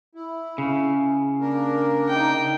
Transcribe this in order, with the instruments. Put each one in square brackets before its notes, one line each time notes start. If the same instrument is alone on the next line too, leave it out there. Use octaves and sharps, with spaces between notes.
[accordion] E4
[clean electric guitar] C#3
[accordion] A#3 D4 A#4
[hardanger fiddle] D#4 G5